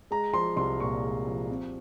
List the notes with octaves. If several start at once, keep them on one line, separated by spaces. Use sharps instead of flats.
G#3 A#5
F3 C6
C2 C6
A#2 C#6
G#3
F3
C3